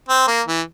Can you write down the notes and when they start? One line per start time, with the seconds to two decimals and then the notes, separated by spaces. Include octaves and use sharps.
0.09 C4
0.27 A#3
0.47 E3